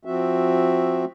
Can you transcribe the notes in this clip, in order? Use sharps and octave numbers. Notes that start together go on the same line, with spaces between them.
F3 C4 F#4 E5